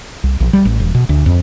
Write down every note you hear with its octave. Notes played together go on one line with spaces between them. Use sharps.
C2
A#1
G3
A1
E1
B2
D2
F2